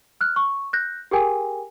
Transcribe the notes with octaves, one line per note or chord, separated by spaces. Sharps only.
F6 F#6
C#6
F#6 G6 A#6
G4 G#4 A#4 G5 G#5